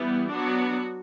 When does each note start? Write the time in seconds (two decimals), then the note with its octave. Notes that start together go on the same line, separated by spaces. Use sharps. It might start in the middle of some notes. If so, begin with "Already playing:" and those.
Already playing: E3 G3 B3 E4
0.30 F#3 B3 D4 F#4